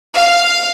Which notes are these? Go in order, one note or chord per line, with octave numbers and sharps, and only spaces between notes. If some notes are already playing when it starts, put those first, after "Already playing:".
F5